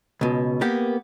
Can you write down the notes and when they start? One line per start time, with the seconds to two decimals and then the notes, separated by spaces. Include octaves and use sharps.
0.21 C#2 B2
0.61 A#3 B3 G4